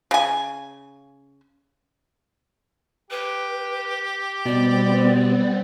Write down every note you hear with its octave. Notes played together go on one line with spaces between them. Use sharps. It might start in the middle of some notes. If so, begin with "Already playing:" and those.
C#3 G#5
G4 B4
B2 G3 B3 C4 D5